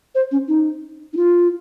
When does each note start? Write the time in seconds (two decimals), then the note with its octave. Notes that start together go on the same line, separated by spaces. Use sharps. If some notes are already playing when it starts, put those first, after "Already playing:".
0.15 C5
0.32 C#4
0.48 D#4
1.13 D#4
1.17 F4